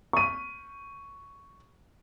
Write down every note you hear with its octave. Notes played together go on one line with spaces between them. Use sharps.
C#6 D#7